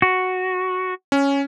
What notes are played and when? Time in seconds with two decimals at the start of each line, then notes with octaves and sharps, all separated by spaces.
0.02 F#4
1.12 C#4